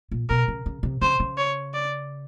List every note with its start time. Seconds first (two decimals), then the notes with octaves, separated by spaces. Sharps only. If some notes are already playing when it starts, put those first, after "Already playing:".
0.11 A#2
0.29 B2 A#4
0.48 C#3
0.66 C#3
0.83 C3
1.02 C#3 C5
1.20 C#3
1.38 C#5
1.74 D5